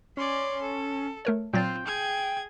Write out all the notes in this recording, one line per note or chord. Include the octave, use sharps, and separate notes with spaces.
C#4 D5 C6
A4
A3 A#4 C#5
A#2 F#3 C4 F4 G5 A6
G#4 G#6